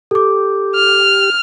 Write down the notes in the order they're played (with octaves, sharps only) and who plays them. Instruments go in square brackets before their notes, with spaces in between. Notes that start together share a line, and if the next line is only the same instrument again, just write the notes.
[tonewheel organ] G4 [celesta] A4 D6
[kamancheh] F6